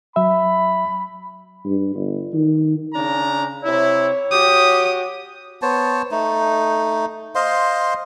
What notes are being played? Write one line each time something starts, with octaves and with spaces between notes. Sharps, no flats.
F#3 E5 B5
G2
G1
D#3
C#3 D4 A#5
C3 E4 C#5
F#4 G4 D#6
B3 C5 C#5 A5
A3 D#4
C5 D#5 F5 C6